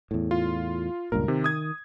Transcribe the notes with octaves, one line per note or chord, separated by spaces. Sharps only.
E2 A2
F4
C#2 G2 A#2 A#4
C3 D#3
D#6 G#6